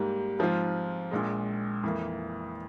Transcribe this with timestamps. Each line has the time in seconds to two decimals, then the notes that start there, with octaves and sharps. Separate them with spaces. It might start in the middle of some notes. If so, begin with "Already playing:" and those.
Already playing: G#2 G3 A#3
0.39 G#2 F3 C4 F4
1.11 A#1 A#2 G#3
1.83 F2 E3 A#3